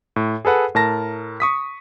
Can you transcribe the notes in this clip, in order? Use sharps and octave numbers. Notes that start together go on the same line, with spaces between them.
A2
G#4 A4 B4 F#5
A2 A#4 A5 A#6
C#6 D#6 B6